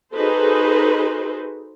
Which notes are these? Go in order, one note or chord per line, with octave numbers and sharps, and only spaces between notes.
D#4 F#4 G#4 A4 B4 C5